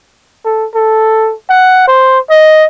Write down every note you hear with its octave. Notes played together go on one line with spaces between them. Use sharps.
A4
A4
F#5
C5
D#5